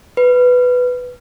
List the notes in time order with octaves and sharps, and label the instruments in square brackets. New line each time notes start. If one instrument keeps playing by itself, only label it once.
[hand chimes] B4